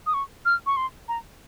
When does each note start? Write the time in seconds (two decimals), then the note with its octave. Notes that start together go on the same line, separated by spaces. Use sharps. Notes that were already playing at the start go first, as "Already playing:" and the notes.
0.06 D#6
0.14 C#6
0.45 F6
0.66 C#6
0.77 C6
1.08 A#5